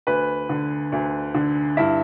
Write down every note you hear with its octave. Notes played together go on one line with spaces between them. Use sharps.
D2 B4 B5
D3
D2
D3
G2 E4 E5